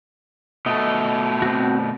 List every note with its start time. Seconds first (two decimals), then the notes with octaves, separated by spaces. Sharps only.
0.66 B2 A3 D#5
1.42 C4 F#4